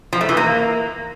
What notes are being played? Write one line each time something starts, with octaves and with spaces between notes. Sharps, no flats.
F3
A3
E3
A#3